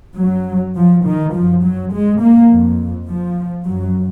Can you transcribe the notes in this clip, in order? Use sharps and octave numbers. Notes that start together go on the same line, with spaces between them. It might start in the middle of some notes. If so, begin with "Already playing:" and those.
F#2 F#3
F3
D#3
F#2 F3
F#3
G#3
A#3
F2
F3
F#2 F#3